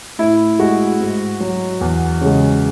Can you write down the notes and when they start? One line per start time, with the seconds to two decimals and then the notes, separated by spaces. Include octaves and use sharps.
0.19 A2 E4
0.59 G#3 F#4
1.00 G#2
1.40 F#3
1.81 E2
2.21 C#3 G#3